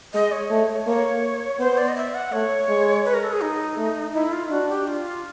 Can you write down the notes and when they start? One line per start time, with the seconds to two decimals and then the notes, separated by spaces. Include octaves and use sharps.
0.13 G#3 D#5
0.32 C#5
0.51 A3
0.86 A#3 C#5
1.59 B3 C5
1.77 D5
1.88 D#5
1.95 E5
2.14 F#5
2.32 A3 C#5
2.69 G#3
3.05 B4
3.14 A#4
3.23 A4
3.32 G#4
3.41 D#4
3.78 A3
4.14 D#4 E4
4.32 F4
4.50 D4 F#4
4.69 G4
4.87 F4